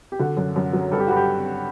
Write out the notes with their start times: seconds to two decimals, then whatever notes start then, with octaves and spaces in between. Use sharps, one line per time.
0.12 G4
0.19 D3 F#4
0.37 F#2
0.56 F#2
0.73 F#3
0.91 G2 A4
1.00 G4
1.08 G2 F#4
1.16 G4